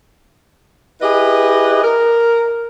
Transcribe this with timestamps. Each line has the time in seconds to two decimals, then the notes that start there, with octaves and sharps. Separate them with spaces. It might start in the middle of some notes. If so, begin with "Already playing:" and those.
1.02 E4 G4 G#4 B4 D#5
1.84 A#4